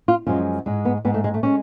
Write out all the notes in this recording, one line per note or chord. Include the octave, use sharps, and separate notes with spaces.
F4
F#2 F3 G#3 F4
G#2 G#3
B3
G#2 G#3 B3
A3
G#3
A3
G#3 C#4